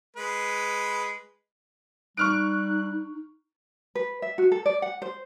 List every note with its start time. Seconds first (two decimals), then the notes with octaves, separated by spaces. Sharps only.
0.16 G#3 B4
2.17 G3 D#4 C#6 F6 F#6 D7
3.95 B4
4.22 E5
4.38 F#4
4.52 A4
4.66 D5
4.82 F#5
5.02 C5